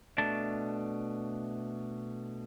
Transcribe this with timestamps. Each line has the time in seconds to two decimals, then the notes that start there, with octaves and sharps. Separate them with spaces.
0.18 B2 A3 D4 A5